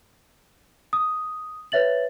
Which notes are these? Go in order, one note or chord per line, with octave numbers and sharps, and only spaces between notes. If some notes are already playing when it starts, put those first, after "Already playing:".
D#6
B4 C#5 E5 A6 F#7